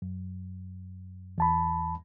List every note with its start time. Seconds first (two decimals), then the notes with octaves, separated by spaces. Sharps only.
0.02 F#2
1.38 E2 A5 B5